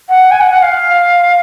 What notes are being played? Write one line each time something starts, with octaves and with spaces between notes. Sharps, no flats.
F#5
G#5
F#5
F#5
F5